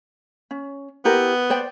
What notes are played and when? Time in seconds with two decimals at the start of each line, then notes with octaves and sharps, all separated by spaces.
0.51 C#4
1.05 B3 E4 G4 A#4
1.50 C5 D5 G5